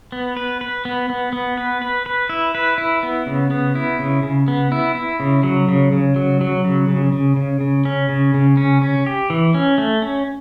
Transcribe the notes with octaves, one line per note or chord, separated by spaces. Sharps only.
B3
B4
B4
B3
B3
B3
B4
B4
B4
E4
B4
E4
B3
C#3
B3
E4
C#3
C#3
B3
E4
E4
C#3
F#3
C#3
C#3
F#3
F#3
C#3
C#3
C#3
C#3
C#3
C#4
C#3
C#3
C#4
C#4
G4
E3
C#4
A3
C#4